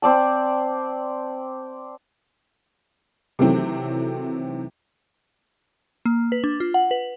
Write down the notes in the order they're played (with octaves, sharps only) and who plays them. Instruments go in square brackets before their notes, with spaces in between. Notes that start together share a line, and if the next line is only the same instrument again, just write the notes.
[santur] C4 D5 A5
[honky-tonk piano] C3 D#3 E3 F#3 A3 C4
[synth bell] A#3
B4
D4
F4
F#5
B4